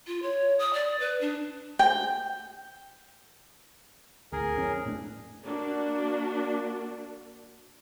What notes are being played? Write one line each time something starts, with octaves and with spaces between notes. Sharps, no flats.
F4
C#5
D#6
D5
B4
D4
G5
D2 A2 G#4 A#4
F2 C4 C#4
A2 A3 D4
A#3 D4 F#4